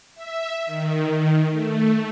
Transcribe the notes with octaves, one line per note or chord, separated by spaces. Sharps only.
E5
D#3
A3